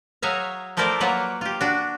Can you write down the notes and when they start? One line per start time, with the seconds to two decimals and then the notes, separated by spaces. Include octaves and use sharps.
0.22 F#3 G#4 C#5 E5 F5 A#5
0.77 F3 A3 E4 A#4 C5 D5
1.00 F#3 A#3 F4 B4 F#5
1.41 F4 G4
1.61 D4 F#4